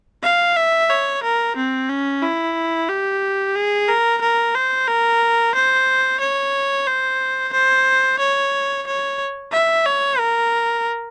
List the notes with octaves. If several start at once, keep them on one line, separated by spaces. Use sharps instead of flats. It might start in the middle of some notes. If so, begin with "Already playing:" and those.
F5
E5
C#5
A#4
C4
C#4
E4
G4
G#4
A#4
A#4
C5
A#4
C5
C#5
C5
C5
C#5
C#5
E5
C#5
A#4